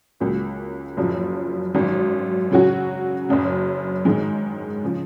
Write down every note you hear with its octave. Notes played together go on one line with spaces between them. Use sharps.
C#2 C#3 F#3 A#3 C#4
F#1 F#2 F3
G#1 F#2 D#3
C#3 F#3 C#4 F#4
F#1 F#2 C#3
G#2 D#3 G#3
C#3 F3